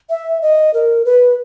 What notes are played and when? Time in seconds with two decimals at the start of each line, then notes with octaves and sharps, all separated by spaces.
0.10 E5
0.42 D#5
0.74 A#4
1.05 B4